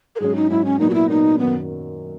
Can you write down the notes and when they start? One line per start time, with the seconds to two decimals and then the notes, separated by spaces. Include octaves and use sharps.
0.16 A#4
0.20 G#2 F#3 C#4 G#4
0.36 D#4
0.50 G#2 F#3 C#4 E4
0.65 C#4
0.79 A#2 F#3 B3 D#4
0.90 F#4
0.94 E4
1.09 A#2 F#3 B3 D#4
1.38 F#2 D#3 F#3 B3